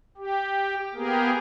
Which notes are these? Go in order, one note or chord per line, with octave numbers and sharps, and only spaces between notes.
G4
A#3 B3 G4 G#4 A#4